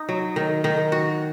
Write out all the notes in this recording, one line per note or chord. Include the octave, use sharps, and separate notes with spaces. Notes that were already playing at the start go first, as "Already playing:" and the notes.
Already playing: D#4
F#3
D#3
D#3
F#4